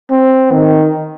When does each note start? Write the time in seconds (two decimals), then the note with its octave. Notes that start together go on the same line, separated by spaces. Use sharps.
0.10 C4
0.52 D#3